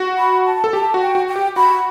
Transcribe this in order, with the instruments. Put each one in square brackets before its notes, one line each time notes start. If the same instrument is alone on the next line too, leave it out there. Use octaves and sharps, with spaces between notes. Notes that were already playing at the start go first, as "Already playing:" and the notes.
Already playing: [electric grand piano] F#4
[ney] B5
A5
[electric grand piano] A4
[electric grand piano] G4 [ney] A5
[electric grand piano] F#4
[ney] G5
[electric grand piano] F#4
[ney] G5
[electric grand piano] G4
[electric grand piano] F#4 [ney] B5